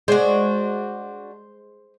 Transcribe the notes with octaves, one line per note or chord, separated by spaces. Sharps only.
G#3 D4 F#4 C5